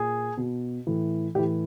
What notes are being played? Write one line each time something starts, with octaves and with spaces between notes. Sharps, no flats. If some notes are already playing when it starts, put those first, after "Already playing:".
Already playing: A#2 G#4
B2
A2 E3
A2 E3 G4